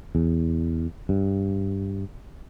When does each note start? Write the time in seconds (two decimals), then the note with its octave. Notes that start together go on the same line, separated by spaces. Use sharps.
0.15 E2
1.09 G2